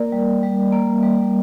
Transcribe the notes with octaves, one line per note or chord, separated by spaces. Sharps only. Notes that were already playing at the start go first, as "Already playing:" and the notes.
Already playing: A#3 A#4 D5
G3
G3
A#3
G3